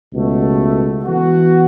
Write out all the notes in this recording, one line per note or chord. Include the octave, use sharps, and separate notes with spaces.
C#2 B2 A3
E3 B3 F#4